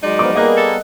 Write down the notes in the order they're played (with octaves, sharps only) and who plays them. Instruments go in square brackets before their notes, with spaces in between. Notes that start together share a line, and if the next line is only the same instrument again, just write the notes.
[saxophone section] F#3 G#3 D5 [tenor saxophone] D#4
[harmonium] F3 B3 A#4 [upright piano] D6
[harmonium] G3 B3 A#4 [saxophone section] A#3 G#4 [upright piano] D#5 F#6
[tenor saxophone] A4